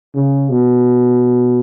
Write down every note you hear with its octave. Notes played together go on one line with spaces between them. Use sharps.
C#3
B2